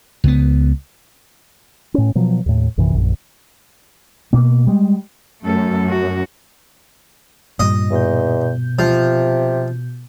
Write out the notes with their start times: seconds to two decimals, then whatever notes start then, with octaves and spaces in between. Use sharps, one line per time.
0.24 C#2 B3
1.94 A2 C#4
2.15 B2 F3 F#3
2.46 D#2 A2
2.77 A#1 F#2 C3 E3
2.94 A#1 F#2
4.33 B2 A#3
4.67 G3 G#3
5.42 F#2 A3 A4
5.89 F#4
7.60 G2 A#2 D#5
7.91 E2 B2 G6
8.79 C3 F3